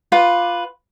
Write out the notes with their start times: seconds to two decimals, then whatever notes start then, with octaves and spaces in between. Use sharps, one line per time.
0.12 F4 B4 D6